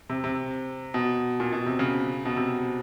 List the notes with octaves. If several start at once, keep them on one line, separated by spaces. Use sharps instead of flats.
C3
C3
B2
A#2
B2
C3
C#3
B2
C3